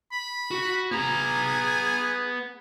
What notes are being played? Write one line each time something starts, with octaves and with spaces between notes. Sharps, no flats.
B5
F#4
B3 G#4 A#5